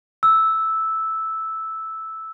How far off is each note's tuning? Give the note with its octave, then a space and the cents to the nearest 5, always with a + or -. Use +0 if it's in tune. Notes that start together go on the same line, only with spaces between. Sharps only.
E6 -5